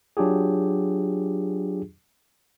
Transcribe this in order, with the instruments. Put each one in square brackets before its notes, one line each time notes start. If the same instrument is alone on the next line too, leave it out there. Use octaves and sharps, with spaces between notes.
[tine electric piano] F#3 D4 F4 G4 G#4